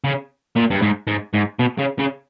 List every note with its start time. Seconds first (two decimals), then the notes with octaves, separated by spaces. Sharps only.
0.04 C#3
0.56 A#2
0.70 G2
0.82 G#2
1.07 G#2
1.34 G#2
1.59 B2
1.79 C#3
1.99 C#3